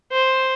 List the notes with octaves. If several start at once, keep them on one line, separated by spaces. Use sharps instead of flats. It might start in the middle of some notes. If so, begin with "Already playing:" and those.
C5